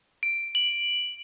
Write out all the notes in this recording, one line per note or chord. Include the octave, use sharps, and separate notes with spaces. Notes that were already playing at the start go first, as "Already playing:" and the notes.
D7
F#7